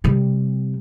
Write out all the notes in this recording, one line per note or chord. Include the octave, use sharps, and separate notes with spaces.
C3 G3